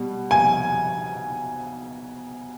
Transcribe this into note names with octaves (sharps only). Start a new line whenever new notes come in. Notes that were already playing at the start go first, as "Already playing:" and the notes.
Already playing: B2 G3
G#5